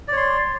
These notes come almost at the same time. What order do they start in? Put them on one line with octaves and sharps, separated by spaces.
D5 C#5 C6